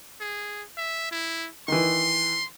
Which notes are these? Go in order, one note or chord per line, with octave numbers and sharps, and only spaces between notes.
G#4
E5
E4
D#3 E3 C6